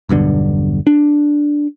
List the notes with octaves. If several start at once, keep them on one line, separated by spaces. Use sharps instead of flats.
E1 B1 G2 D3
D4